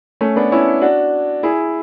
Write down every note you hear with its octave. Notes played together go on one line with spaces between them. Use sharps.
A3 C#4
B3 D4
C#4 E4
D4 F#4
E4 G#4